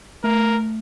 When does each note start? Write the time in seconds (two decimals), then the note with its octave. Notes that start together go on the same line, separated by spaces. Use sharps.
0.24 A3 A#4